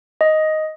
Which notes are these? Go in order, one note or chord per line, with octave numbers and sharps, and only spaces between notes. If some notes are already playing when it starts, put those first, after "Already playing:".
D#5